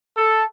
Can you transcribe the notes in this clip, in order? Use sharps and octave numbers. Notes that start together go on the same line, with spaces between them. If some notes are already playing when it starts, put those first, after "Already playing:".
A4